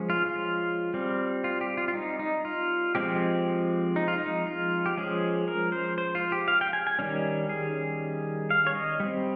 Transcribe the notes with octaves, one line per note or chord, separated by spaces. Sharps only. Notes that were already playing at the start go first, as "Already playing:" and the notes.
Already playing: F3 G#3 C#4
F4
F4
G3 C4
F4
G4
F4
F4
D#4
D#4
F4
F3 G#3 C4 G4
D#4
F4
D#4
F4
G4
F3 G#3 C#4 G#4
A#4
C5
C5
F4
G4
F5
G5
G#5
G#5
D#3 G3 C#4
G#4
F5
C#5
D#5
G3 C4